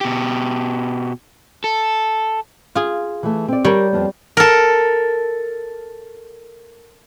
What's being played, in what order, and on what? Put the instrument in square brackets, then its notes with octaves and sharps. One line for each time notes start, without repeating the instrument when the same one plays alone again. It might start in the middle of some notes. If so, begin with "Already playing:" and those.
[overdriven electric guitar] B2 G4
A4
[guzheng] F4 G#4
[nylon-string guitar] E3 A3
C4 D5
[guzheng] G3 C#5 G5 [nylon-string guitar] G4 A#4
[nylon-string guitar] F2 F3 B3
[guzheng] A4 A#4